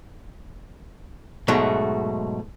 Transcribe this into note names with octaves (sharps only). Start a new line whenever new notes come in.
G#2 B2 F#3 G#3 A3